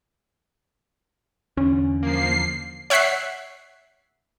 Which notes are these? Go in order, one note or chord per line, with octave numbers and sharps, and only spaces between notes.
E2 D3 C#4
F3 A#3 C7
C#5 E5 F#5 F#6 B6 C7